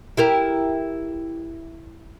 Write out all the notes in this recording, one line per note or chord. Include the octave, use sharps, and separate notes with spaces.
E4 G4 A#4